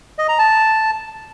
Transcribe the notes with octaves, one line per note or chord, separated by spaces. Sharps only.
D#5
A#5
A5